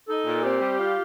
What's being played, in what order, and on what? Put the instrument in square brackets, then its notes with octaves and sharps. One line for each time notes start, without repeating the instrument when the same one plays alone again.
[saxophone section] D#4 [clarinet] A4
[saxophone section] A#2
[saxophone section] C4 [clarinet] G4
[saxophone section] G3
F4